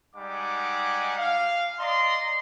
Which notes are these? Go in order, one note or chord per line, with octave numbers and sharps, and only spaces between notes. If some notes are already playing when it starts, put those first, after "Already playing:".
G3 G#3 D#4 F#5 G#5 D6
F5
D5 D#5 A#5 C6